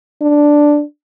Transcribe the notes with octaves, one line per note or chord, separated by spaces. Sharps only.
D4